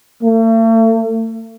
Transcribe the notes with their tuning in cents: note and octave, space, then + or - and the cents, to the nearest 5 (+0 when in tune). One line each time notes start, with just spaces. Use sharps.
A3 +40